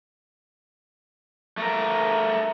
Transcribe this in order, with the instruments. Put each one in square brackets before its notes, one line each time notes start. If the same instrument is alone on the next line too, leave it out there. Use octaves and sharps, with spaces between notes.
[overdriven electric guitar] A3 A#4